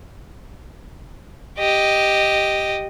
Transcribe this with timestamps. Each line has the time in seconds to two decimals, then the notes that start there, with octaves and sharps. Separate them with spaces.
1.59 G4 D#5